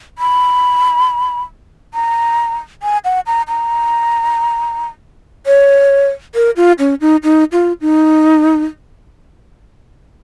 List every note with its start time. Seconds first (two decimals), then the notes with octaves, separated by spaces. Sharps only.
0.18 B5
1.94 A#5
2.83 G#5
3.05 F#5
3.27 A#5
3.48 A#5
5.47 C#5
6.35 A#4
6.57 F4
6.79 C#4
7.01 D#4
7.23 D#4
7.52 F4
7.81 D#4